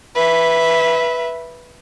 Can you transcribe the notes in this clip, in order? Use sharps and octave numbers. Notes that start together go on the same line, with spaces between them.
B4 E5